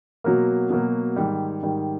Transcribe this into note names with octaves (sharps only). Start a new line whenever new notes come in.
B2 F#3 A#3
B2 F#3 A#3
G#2 D#3 G3
G#2 D#3 G3